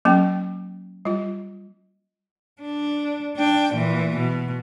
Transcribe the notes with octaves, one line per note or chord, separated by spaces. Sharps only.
F#3 A#3 C#4 G5
G3 F4
D4
D4 G5
A#2 E3
B2